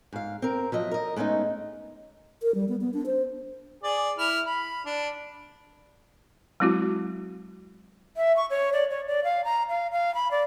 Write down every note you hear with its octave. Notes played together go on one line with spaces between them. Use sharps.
G#2 F5
C4 A#4
F3 F#3 D#5 E5
A#4 D#5
G#3 A3 B3 C#4 D#4
A#4
G3
B3
B3
D4
C5
G#4 D5
E4 F6
B5
D4
F#3 G#3 C4 E4 F#4
E5
C#6
C#5
D5
C#5
D5
F5
A#5
F5
F5
B5
D5